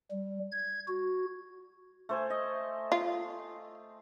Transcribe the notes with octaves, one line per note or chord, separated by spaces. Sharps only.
G3
G#6
F#4
A3 C5 G#5
D#5
F4